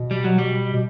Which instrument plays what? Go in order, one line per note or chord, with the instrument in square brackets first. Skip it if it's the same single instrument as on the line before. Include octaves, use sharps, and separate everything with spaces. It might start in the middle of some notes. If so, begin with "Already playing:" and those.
Already playing: [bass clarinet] B2
[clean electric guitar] G3
F#3
G3
[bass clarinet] B2